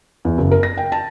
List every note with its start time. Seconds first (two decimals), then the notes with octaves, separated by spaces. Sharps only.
0.25 E2
0.38 F#1
0.51 A#4
0.63 A#6
0.77 G5
0.92 A5